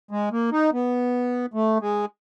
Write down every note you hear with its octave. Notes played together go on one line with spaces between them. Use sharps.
G#3
A#3
D#4
B3
A3
G#3